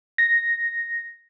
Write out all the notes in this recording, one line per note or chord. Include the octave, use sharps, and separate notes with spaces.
A#6